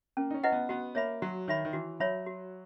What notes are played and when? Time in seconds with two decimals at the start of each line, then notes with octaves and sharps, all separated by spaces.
0.17 A#3 C#4
0.31 D#4
0.34 C#4
0.44 E4 B4 D#5 F#5
0.52 B3
0.69 B3 F#4
0.95 A#3 C#5 E5 B5
1.22 F#3 F#4
1.48 D#3 C#5 E5 B5
1.65 D#3
1.73 E3 F#4
2.00 F#3 C#5 E5 B5
2.26 F#4